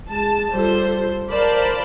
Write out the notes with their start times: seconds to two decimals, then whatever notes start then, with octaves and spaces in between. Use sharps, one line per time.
0.10 G#3 A5
0.52 G3 F4 A4 C5
1.31 A#4 C5 D5 F5 A5 B5